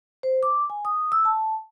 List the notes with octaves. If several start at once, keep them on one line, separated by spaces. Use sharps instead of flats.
C5
D6
G#5
D#6
E6
A5